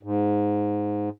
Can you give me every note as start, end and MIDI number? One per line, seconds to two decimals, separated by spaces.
0.03 1.09 44